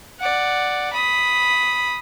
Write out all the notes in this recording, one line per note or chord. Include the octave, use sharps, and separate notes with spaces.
D5 F#5
B5 D#6